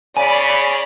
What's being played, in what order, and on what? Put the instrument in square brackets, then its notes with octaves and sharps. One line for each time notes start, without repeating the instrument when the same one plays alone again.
[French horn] C#3 [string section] D5 B5 [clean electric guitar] G#5